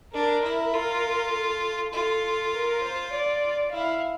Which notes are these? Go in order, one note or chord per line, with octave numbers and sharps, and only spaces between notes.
D4 A#4
E4
F4 A#4
A4
F4 A4
A#4
C5
D5
E4 F5